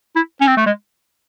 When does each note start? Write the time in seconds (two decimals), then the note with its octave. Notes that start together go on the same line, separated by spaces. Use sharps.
0.16 E4
0.41 C#4
0.47 C4
0.57 A3
0.66 G#3